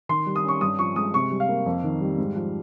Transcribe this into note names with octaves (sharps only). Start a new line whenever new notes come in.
D#3 C6
G3
D#6
C#4 C#6
G2 D#6
F3 C#6
G#3 D#6
C3 C#6
G3
F5
A#3
F2
D#3
G3
G#2
F3